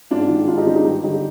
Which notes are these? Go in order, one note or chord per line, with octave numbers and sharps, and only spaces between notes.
G#2 D4 F4
D#3
G#2 D4 F4
D#4 G4
D#3 D4 F4
D#4 G4
G2
D3 D#4 G4